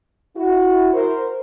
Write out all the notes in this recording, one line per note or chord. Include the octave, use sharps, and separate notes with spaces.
E4 F#4
A#4 C5